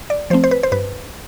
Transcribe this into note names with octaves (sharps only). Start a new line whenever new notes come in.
D5
F3 A3 C4 C5
C5
B4
C5
G2 B4